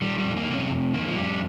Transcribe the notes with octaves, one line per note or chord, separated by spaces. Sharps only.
D#3 G3
G3
F2
A#3
C3
C#4
F2
D#3 A#3
F3
F2 G3